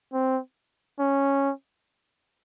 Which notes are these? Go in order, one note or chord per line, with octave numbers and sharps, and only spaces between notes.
C4
C#4